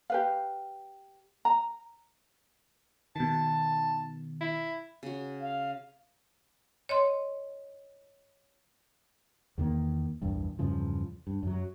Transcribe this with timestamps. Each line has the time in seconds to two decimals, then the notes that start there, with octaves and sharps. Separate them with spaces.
0.10 G4 B4 F5
1.45 A#5
3.16 B2 D#3 A5
4.41 E4
5.03 C#3 F#4
5.42 F5
6.89 C#5 D#5 C6
9.58 E2 D#3 A#3
10.22 A#1 E2 G2
10.59 E2 G2 C#3 F3
11.27 G2
11.43 F#2 F#3